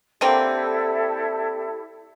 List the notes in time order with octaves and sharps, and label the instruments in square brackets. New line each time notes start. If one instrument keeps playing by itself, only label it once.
[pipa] D3 A#3 C4 [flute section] E4 G4 A4